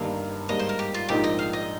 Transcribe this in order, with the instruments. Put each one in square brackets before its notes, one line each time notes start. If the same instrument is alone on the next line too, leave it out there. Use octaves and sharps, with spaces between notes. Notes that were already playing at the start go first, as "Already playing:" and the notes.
Already playing: [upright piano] G1 G2 D#3 A#3 [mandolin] F5
[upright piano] G#2 G3 A#3 [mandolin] D#5
[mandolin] C5
A#4
G4
F4
[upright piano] A#1 G#2 F3 A#3 D#4 [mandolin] G4
[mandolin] D#5
F5
D#5